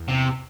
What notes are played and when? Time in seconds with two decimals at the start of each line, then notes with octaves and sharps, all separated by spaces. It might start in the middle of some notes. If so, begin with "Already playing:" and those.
Already playing: E2
0.08 C3